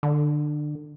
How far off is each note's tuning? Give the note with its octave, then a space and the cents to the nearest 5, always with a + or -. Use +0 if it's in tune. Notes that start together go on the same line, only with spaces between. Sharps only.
D3 +25